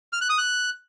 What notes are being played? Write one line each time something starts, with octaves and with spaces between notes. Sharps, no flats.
F6
F#6
D#6
F#6